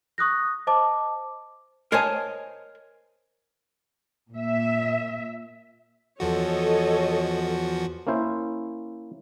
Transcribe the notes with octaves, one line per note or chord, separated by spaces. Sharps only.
C#6 D#6 F#6 A#6
C5 D#5 A5 D6
A#4 C5 C#5 D#5 G#5 A5
A#2 E5
E2 F3 F#4 A4 C#5 D#5
A#3 C#4 E4 C5